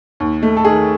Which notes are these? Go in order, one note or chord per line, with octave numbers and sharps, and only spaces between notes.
D#2
A3
A4
D#3 G#4